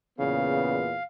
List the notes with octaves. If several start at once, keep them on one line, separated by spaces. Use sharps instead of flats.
E2 A#2 C#3 B3 F5